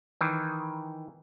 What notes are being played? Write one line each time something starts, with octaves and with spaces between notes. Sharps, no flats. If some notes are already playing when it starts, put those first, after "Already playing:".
D#3 E3